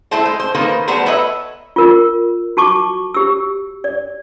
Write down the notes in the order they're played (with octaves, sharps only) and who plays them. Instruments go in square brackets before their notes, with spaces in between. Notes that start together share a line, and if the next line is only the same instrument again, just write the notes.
[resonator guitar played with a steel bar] A3 E4 A4 C5 A5
G#3
C5
D#3 A#3 D#4 A4 B4 C5
G3 A3 B3 C5 A5 A#5
A4 B4 C#5 D#5 E5
[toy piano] F4 A#4
F#4 A5 C#6 D6
G4 E6
D5